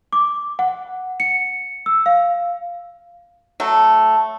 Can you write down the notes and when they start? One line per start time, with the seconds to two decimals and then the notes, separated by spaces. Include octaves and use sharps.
0.13 D6
0.59 F#5
1.20 C#7
1.86 E6
2.06 F5
3.60 F#3 A3